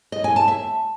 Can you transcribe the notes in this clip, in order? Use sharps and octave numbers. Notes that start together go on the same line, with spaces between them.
D#5
G#5
A5
E5